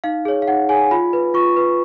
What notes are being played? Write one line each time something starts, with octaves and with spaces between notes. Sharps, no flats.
D#4 F5
G#4 C#5
F5
D#4 F#5
G#4 C#5 G#5
F4 B5
B4
F4 C#6
B4